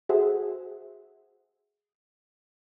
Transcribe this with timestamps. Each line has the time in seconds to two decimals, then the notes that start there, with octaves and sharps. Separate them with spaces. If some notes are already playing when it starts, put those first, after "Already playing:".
0.09 F#4 G#4 A4 C5 E5 F#5